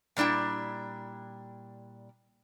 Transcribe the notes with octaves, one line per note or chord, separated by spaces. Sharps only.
A#2 G3 D4 E4 G5